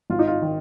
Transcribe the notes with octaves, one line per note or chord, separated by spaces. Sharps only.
G#1 F4
D#4
F4
D#3